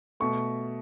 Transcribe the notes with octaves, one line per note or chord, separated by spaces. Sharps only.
B2 A3 C#6